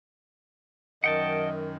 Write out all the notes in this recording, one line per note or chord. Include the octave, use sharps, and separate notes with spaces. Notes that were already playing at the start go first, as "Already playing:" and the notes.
F#2 D#3 D#5 F#5 G5 A5